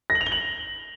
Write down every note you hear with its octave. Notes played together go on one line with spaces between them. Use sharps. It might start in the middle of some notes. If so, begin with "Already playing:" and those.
A#6
F#7
F7
G7
F#7